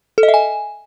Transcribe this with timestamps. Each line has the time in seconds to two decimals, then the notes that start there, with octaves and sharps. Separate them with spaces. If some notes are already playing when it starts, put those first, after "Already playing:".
0.18 A4
0.23 D#5
0.28 E5
0.34 G#5